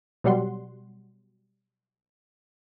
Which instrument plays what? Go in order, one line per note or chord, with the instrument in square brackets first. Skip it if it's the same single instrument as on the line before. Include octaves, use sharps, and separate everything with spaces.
[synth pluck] B2 F#3 G3 F#5 C6